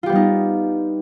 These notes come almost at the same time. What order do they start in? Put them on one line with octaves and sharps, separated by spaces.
F4 G4 B3 G3 D#4